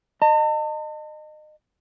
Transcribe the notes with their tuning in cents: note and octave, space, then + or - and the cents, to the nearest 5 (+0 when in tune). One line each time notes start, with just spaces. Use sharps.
D#5 -25 A5 +40